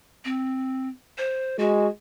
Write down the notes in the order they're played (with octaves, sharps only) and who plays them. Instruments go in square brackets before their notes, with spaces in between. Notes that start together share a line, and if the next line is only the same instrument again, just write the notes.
[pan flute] C4
C5
[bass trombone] G#3 [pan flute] F#4